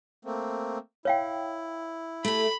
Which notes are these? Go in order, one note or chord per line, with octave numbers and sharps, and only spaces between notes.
A3 A#3 C4
E4 C#5 F5 G5
A3 G4 B5